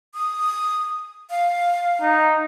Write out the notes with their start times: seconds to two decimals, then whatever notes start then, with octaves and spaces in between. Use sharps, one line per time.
0.14 D#6
1.30 F5
2.01 D#4